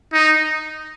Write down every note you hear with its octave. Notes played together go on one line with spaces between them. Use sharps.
D#4